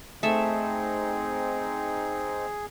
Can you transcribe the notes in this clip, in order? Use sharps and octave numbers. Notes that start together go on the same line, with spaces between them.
A3 C4 D#4 G#4 E5